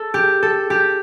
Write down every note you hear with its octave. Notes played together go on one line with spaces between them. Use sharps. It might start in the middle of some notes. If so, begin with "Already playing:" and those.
Already playing: A4
G4
A4
G4